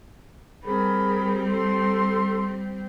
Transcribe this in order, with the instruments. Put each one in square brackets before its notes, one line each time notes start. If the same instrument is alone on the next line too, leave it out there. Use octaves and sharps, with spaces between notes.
[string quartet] G3 C4 [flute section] G#4 A#4 B5
[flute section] A4 C6